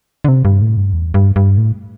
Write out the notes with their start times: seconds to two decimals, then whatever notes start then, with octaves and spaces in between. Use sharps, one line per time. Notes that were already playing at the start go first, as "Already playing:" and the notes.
0.24 D3
0.28 C3
0.45 G2
0.62 A2
0.77 G2
0.93 E2
1.14 G2
1.36 G2
1.58 A2